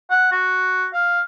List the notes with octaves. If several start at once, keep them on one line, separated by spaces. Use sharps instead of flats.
F#5
F#4
F5